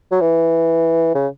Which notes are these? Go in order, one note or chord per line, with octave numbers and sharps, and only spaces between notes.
F#3
E3
C#3